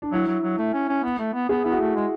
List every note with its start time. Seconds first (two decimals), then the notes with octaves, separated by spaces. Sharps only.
0.02 D4
0.12 F#3 E4
0.27 F#3
0.43 F#3
0.58 A3
0.73 C#4
0.88 C#4
1.03 B3
1.19 A3
1.34 B3
1.49 B3 G#4
1.64 B3 E4
1.72 F#4
1.80 A3
1.95 G#3